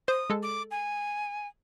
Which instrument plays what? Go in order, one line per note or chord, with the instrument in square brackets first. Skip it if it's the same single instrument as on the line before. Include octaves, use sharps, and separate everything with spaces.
[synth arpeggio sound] C5 [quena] D#6
[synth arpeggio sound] G#3 A4
[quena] D6
G#5